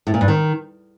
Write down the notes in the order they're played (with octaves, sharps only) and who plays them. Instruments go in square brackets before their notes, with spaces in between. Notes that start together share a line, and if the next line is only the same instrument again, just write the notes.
[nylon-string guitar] A2
A#2
G2
D#3